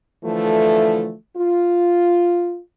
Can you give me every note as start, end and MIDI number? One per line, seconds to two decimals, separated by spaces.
0.24 1.13 50
0.24 1.13 52
0.24 1.13 53
0.24 1.13 57
1.37 2.58 65